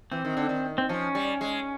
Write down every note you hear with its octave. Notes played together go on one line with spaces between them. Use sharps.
E3 C4
D#3
D3
D#3
C4
F3 C#4
G3
G#3